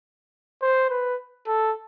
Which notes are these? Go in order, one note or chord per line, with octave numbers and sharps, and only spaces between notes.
C5
B4
A4